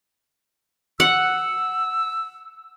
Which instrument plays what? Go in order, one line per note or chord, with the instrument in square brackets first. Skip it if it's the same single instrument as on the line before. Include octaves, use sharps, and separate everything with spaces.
[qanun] F#5 [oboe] E6